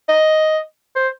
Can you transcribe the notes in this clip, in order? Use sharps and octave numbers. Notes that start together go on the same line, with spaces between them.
D#5
C5